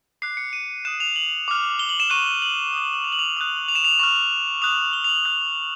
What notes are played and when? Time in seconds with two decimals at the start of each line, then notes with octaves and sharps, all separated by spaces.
0.22 D6 F#6 C7
0.37 C#7
0.53 D#7
0.85 D#6 F#6 E7
1.00 F7
1.16 F#7
1.48 D6 F6
1.79 G7
1.89 F#7
2.00 E7
2.10 C#6 F#6 D#7
2.26 G7
2.42 F#7
2.73 D#6 F#6
3.04 F7
3.12 F#7
3.19 F7
3.37 D#6 F#6
3.68 F7
3.75 E7
3.84 F7
3.99 C#6 F6
4.62 D#6 F#6 F7
4.93 G7
5.04 F7
5.09 F#7
5.25 D#6 F#6
5.41 F7